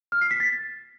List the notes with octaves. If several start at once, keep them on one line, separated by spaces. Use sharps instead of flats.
F6
C7
B6
A6